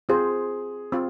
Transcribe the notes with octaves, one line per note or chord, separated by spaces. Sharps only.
C4 F4 G#4 C5
C4 F4